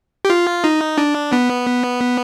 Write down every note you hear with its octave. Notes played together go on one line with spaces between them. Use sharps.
G4
F4
D#4
D4
B3